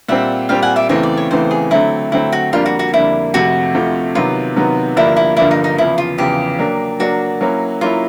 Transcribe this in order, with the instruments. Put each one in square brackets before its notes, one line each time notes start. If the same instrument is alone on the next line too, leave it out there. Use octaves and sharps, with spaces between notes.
[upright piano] A#2 G3 C4 [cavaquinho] E5 F#5
[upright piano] A#2 G3 C4 [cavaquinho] F5 G5
[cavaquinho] F#5 G#5
D5 E5
[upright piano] E2 C#3 E3 A3 C4 [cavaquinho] C#5 D#5
[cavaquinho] D5
C#5
[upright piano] E2 C#3 E3 A3 C4 [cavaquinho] C5
[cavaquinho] G#4
[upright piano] D3 F#3 A3 C4 [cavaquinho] E4
[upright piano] D3 F#3 A3 C4 [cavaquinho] E4
[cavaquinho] F#4
[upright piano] F2 D3 G3 A#3 D4 [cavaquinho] F4
[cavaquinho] F#4
F#4
[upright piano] F2 D3 G3 A#3 D4 [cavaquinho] E4
[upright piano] F2 C3 F3 A3 [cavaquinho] F#4
[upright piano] F2 C3 F3 A3
[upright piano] C3 D#3 F#3 B3 [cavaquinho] F4
[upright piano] C3 D#3 F#3 B3
[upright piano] G2 D3 F3 A#3 D4 [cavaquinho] E4
[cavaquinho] E4
[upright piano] G2 D3 F3 A#3 D4 [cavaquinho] E4
[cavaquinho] D#4
D#4
[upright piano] E2 C#3 F3 [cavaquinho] E4
[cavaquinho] F4
[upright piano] E2 C#3 F3 [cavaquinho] G4
[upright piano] F#3 A#3 D4
[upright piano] F#3 A#3 D4 [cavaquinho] F#4
[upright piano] F#3 A#3 C#4 E4
[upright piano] F#3 A#3 C#4 E4 [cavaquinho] F4